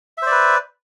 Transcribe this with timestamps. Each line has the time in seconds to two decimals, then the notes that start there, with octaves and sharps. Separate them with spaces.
0.18 E5
0.22 C5
0.27 D5
0.31 B4